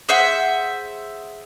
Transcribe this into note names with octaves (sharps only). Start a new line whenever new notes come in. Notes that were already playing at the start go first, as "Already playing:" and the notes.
G#4 C5 E5 F#5